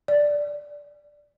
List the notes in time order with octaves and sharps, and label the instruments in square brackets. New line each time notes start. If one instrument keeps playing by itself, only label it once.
[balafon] D5